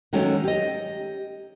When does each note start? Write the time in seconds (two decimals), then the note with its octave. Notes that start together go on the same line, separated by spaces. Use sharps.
0.13 D#3 F#3 G#3 A3 C#4
0.44 G4 D#5